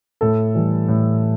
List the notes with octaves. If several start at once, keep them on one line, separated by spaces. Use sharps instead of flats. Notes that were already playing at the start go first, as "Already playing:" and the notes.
A2 A4
E3 G3
A2